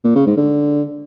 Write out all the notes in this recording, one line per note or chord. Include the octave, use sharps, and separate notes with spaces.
A#2
C#3
G#2
D3